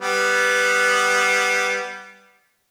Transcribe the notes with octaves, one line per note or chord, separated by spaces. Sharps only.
G3 B3